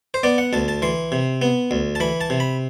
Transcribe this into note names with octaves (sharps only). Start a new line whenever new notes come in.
C5
B3 D5
F#5
D2 A5
A5
E3 C6
C3
B3
D2
A5
E3 B5
A5
C3
B5